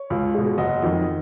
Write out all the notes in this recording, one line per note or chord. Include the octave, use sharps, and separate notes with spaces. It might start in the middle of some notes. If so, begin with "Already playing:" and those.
Already playing: C#5
C#2
B2 G#3
F#1 D#5 F#5
F2 D#3